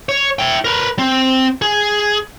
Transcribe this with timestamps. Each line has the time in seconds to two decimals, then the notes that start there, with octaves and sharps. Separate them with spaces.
0.09 C#5
0.39 E4 G5
0.65 A#4 B4
0.99 C4
1.62 G#4